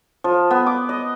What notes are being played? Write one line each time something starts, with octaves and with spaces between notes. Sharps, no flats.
F3
B3
D6
D#5